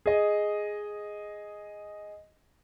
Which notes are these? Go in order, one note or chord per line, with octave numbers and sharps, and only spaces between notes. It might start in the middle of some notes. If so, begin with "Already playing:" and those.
G#4 D#5